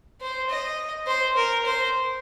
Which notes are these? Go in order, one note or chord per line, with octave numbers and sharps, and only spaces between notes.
C5
D#5
C5
A#4
C5